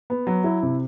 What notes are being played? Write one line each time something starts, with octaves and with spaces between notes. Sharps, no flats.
B3
F#3
E4
C3